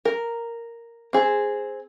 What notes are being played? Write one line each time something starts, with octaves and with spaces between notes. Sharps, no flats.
A#4
C4 G#4